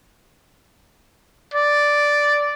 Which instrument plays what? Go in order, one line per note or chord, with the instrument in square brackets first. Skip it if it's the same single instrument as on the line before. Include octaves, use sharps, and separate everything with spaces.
[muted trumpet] D5